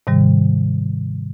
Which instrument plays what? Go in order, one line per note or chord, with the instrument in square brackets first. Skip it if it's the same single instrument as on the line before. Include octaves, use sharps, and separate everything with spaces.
[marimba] G#2 C3 D#3 G3